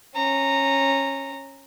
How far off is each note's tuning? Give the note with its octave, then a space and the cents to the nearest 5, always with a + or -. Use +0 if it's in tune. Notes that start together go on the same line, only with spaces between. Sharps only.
C#4 -15 A#5 -10